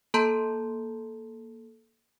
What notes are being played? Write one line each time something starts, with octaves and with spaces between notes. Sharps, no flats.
A#3 A4 A5 A#5 C6 G6